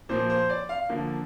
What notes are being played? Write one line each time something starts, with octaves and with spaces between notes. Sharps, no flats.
A#2 F3 A#3 C5
C5
D5
F5
D3 F3 A#3